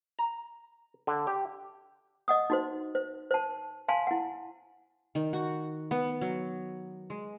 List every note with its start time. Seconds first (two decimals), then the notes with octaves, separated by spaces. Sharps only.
0.19 A#5
1.07 D3
1.27 G4
2.28 D#5 F#5 D#6
2.50 D#4 F#4 C5
2.95 C5
3.31 C5 A5
3.88 F5 G#5 A5 C6
4.07 E4 F#5
5.15 D#3
5.33 F#4
5.91 B3
6.21 F#3
7.10 G#3